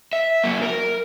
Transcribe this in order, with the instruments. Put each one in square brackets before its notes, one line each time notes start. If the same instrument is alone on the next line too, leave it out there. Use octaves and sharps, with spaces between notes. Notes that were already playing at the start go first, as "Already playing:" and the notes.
[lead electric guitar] E5
F#3 A#3
A#4